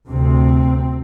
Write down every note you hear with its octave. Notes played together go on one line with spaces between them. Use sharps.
D2 C3 C4